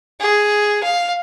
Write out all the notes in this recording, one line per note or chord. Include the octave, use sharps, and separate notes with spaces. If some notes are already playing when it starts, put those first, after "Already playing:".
G#4
F5